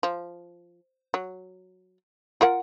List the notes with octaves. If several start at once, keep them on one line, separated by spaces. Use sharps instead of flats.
F3
F#3
F4 A#4 F#5